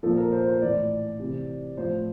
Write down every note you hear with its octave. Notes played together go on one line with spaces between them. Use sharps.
A#2 F3 A4
A#4
C5
C5
A2 E3 D5
C3 E3
A2 F3 C5